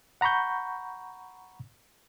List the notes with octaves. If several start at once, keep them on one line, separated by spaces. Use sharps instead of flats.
F#5 A#5 B5 C#6 G6